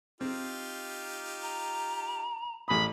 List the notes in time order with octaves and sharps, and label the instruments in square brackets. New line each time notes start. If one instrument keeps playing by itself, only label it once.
[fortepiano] C4 [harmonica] D#4 F4 G4
[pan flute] A#5
[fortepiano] A1 D#6 [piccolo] B5